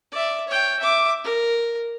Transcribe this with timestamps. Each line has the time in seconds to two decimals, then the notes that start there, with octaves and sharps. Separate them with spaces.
0.12 D5 E5
0.47 C#5 G5
0.79 E5 D6
1.24 A#4